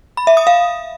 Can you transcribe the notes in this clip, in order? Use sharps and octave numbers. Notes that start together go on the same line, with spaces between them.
B5
E5
D#6
F5